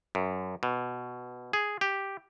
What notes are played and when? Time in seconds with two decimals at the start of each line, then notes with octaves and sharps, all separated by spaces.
0.15 F#2
0.63 B2
1.53 G#4
1.81 G4